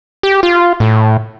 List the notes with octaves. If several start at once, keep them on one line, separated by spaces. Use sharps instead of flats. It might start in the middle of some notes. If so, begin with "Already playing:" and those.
G4
F4
A2